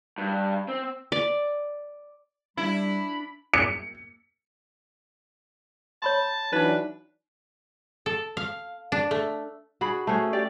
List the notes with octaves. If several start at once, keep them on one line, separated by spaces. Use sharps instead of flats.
G2
C4
D5
G3 D4 E4 B5
C#7
C#5 A5 B5 C6
E3 F#3 D4 D#4 B4
A4
F5
D4
A3
D4 F#4 G#4 B5
A3 C#4 F#4 G#4 C5
D4 G4 D5